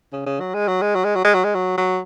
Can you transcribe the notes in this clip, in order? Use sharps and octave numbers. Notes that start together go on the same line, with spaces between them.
C#3
C#3
F#3
G#3
F#3
G#3
F#3
G#3
F#3
G#3
F#3
G#3
F#3
F#3